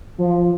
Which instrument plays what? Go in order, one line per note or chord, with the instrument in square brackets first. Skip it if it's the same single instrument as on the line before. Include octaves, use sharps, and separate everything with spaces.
[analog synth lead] F3